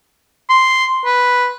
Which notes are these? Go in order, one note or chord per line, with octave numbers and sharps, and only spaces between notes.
C6
B4